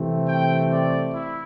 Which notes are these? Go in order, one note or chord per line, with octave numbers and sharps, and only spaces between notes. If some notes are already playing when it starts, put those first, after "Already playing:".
Already playing: C3 E3 A3 C4
G5
D5
E4